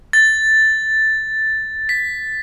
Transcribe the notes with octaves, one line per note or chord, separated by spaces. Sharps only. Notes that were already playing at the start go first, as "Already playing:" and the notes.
A6
B6